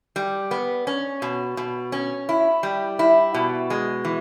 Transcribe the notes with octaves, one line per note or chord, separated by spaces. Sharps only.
G3
B3
C#4
B2
B2
C#4
E4
G3
E4
B2
G#3
E3